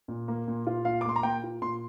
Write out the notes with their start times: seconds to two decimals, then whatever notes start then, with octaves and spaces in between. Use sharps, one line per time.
0.08 A#2
0.28 A#3
0.48 A#2
0.67 F4
0.85 A#2 F5
1.01 D6
1.05 A#3 C6
1.16 A#5
1.23 A#2 G5
1.43 F4
1.62 A#2 C6